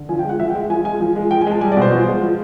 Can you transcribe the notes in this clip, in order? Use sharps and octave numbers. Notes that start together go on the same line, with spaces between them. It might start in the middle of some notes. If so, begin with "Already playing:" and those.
Already playing: D3
F3 G#5
G5
G#3 F#5
F3 E5
G5
G#3
F3 G#5
G#3 G#5
F3
G#3
F3 G5
G#5
G#3 A5
G3 G#5
D5
B2 C5
F3
G#3
F3